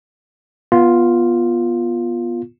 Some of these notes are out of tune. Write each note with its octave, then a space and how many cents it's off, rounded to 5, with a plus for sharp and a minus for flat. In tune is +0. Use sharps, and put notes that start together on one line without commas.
B3 -20 F4 +0